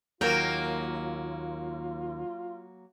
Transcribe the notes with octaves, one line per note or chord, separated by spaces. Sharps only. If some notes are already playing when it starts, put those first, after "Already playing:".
D#2 F#3 A#3 F4 A#4 G5